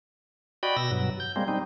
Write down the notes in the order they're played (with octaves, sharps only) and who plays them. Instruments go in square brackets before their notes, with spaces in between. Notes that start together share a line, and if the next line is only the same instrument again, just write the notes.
[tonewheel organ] F#4 D5 D#5 G5 B5
B2 E6 A#6
G2 B2 F#3
G6
G3 G#3 A#3 C4
G3 C4 D#4